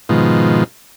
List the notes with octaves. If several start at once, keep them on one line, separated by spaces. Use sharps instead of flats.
G#2 B2 D#3 F3